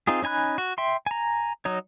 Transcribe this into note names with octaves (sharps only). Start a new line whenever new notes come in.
C4 D#4 F4 G#4
C#4 D#4 G#5 B5 F#6
F#4
E5 G5 C6
G#5 A#5
F#3 D#4 C#5